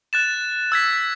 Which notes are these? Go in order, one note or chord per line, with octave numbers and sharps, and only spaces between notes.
F#6 A6 E7
E6 G#6 B6